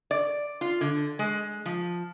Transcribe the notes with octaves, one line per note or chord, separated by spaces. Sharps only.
D5
F4
D3
G#3
F3